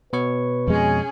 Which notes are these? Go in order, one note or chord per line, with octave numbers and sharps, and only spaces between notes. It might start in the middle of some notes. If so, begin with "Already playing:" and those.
B2 B4 C#5 C#6
F2 G#3 C#4 G#4